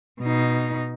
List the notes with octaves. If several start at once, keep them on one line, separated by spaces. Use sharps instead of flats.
B2 D#4